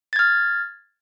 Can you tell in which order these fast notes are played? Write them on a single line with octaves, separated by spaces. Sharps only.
A6 G#6 F6